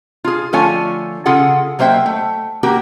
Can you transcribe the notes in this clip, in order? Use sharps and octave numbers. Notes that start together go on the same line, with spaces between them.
F4 G#4
D3 F3 A3 F4 C#5 G#5
C#3 F4 G#4 A4 F#5
F#3 A#3 C5 E5 G5
A3
A#3 F#4 G4 A#4